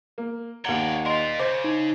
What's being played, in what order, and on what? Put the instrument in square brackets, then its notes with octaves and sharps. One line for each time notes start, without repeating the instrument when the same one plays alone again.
[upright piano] A#3
[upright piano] D#2 F#7 G7 [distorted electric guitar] C#5 D5 [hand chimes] F#5 A#5
[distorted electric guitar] F4 A#4 [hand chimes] D5 D#5 C6
[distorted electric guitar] C#3 [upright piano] C5 [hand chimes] D6
[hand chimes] D#4